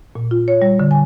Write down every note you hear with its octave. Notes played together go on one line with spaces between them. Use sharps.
A#2
F4
C#5
G3
D3
G#5